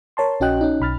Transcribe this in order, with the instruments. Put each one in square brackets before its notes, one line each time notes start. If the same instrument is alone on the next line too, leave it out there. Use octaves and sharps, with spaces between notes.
[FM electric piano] A#4 C#5 A5 C6
A#1 C#4 F#4 D#5 G5 F#6
C#4 D#4
B1 B5 F6 A6